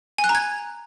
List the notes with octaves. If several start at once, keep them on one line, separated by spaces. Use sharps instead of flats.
G#5
F#6
A#5
G#6